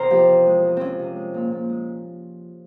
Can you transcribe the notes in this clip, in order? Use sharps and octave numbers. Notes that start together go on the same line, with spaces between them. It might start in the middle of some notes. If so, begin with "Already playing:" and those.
Already playing: E2 C3 A#4 C5
F3 G4
C3
G#3
C3
F3 C4 C#4
C3
G#3
A#2
A#2
G#3